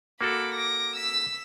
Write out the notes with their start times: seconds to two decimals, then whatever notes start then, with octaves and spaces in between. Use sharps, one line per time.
0.21 A#3 F#4 A4 B5 D6
0.54 D6 A#6
0.96 E6 B6